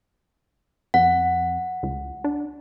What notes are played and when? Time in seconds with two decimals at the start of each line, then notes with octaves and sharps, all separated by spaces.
0.94 F2 F#5
1.83 C#2
2.24 D4